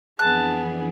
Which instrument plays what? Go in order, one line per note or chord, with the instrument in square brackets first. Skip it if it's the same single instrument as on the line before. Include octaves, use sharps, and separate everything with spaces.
[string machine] F2 E3 D4 [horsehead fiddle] B3 G#4 [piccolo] A5 [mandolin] F#6